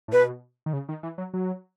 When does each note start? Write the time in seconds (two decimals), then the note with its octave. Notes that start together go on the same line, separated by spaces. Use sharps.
0.08 A2
0.13 B2 B4
0.66 D#3
0.73 C#3
0.89 D#3
1.03 E3
1.18 F#3
1.34 F#3